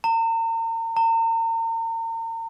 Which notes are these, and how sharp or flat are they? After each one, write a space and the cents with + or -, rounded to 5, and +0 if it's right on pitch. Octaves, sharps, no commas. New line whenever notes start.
A#5 -40
A#5 -40